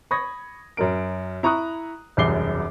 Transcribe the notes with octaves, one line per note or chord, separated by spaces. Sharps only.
B5 C#6 D#6 G#6 A#6
F#2 F#3 A#4 D7
E4 A#5 C#6 D#6 F#6
E1 C2 F#2 D6 C7 G7